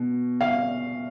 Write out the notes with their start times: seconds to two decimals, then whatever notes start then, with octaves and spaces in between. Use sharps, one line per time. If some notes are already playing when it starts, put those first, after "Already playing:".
Already playing: B2
0.41 F5